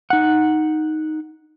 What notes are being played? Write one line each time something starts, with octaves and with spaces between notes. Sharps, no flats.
D#4 F#5